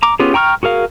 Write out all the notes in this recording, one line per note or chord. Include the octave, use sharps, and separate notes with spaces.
A#5 D6
B3 C#4 F4 G4 G#4
G5 A#5 C#6 E6 F6
F#4 G#4 A#4 F5